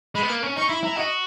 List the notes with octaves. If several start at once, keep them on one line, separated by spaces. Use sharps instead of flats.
G#3 B5
B3
A#3
C#4
D#4 C#6
E4 B5
E4 A#5
F#4 D#5